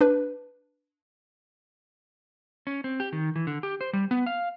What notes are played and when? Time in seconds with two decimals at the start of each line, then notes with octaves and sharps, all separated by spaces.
0.01 D4 B4
2.67 C#4
2.84 C4
3.00 G4
3.13 D#3
3.36 E3
3.47 D3
3.63 G4
3.81 C5
3.93 G3
4.11 B3
4.26 F5